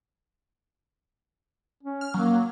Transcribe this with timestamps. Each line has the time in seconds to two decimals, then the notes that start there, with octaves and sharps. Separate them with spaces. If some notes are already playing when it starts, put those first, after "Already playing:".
1.83 C#4
2.01 F6
2.14 F#3 A#3